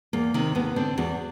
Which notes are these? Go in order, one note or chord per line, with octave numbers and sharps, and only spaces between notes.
E2 A#3
C3 D#3
D#2 B3
D3 C4
E2 F#4